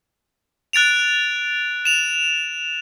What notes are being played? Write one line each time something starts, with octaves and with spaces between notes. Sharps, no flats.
F#6 A6 D7 F7
E7 F7